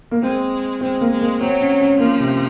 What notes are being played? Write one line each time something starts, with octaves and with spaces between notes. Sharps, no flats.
A#3
G#3 C4
G#3 C4
A#3
G#3
A#3
F#3 C4
C#4
C#4
F3 A#3
C3